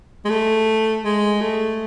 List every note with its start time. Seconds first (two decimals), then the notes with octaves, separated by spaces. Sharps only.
0.25 G#3
0.30 A3
1.05 G#3
1.41 A3